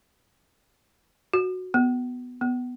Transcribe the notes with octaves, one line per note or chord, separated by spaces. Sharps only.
F#4
B3
B3